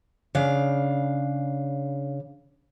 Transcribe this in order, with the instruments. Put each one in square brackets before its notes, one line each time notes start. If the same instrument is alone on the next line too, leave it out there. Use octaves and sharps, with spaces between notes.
[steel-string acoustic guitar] C#3 D4 F5